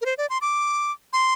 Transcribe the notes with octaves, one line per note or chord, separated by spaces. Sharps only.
A#4
C5
D5
C6
D6
C6